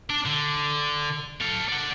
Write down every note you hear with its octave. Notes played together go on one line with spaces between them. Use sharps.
D4
D3
A4 F5
D5 F#5